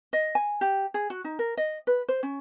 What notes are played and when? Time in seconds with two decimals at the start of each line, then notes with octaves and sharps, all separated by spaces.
0.13 D#5
0.35 G#5
0.61 G4
0.94 G#4
1.10 F#4
1.24 D#4
1.39 A#4
1.57 D#5
1.87 B4
2.09 C5
2.23 C#4